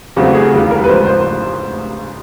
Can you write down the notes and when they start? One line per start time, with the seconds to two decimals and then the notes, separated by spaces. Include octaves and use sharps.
0.16 E2 C#3 F#3 A3 C4 F#4
0.35 G#4
0.53 F1 D#2 C#3 E3 G3
0.71 A#4
0.84 B4
0.88 A1 G#2 F3 C5
1.06 C5